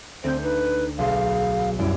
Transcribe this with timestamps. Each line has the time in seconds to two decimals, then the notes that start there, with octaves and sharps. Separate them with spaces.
0.24 D2 C4 C5 G6
0.42 D#4 B4
0.99 B1 G#4 F5 C6
1.79 F#2 G3 E4 D7